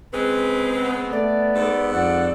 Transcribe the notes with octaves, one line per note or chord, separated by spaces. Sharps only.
C#3 G#3 C4 B4
B3
A3 D5
G#2 A4
F2 D5 F#5